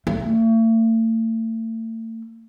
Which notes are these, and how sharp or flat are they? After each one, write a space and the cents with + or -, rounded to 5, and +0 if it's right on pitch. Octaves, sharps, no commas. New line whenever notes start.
A3 +40